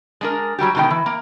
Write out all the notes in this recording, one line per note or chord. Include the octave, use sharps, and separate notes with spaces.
G#3 D4 A#4
F#3 G3 F#4 G4
B2 D3 D#3 G#3 G5
E3
A#3